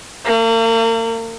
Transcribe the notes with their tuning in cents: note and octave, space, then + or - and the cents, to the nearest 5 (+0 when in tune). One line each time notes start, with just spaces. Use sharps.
A#3 -40